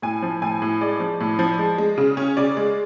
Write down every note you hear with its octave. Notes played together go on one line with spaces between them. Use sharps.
A2 G#5
F3
A2 G#5
A2
G#3 D5
F3
A2
F3
G#3
G#3
C#3
C#4
C#3 D5
G#3